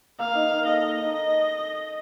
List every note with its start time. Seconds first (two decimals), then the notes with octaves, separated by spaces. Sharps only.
0.19 A#3 F5
0.35 D#4
0.51 A#3
0.66 A4 D#5
0.82 A4
0.98 D#4